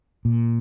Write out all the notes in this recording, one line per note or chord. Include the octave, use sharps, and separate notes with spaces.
A#2